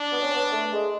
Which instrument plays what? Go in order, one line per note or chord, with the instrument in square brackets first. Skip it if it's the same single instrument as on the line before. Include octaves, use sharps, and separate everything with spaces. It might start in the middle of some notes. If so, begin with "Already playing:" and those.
Already playing: [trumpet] D4
[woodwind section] B3
C#4
B3
A3
G#3